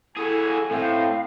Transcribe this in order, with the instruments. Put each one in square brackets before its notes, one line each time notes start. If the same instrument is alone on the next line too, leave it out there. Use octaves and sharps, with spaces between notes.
[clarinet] E4 [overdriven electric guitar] F#4 G#4 [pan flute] A4 [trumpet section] G#5
[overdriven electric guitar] A2 [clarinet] C4 [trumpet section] D#4 C5 [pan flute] F5